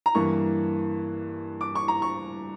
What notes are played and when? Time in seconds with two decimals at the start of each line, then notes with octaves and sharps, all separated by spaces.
0.06 A#5
0.15 G2 E3 A#3 C#6
1.61 D6
1.75 C#6
1.88 A#5
2.02 C#6